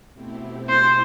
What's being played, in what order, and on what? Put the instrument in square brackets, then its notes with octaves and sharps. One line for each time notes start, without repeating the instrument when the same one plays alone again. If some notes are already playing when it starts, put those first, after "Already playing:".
[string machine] B2 A3 C4 E4 G4
[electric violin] C5